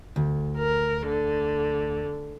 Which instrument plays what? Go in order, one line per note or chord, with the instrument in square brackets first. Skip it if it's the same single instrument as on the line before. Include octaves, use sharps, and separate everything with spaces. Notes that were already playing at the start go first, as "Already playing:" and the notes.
[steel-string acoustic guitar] D2
[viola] A#4
D3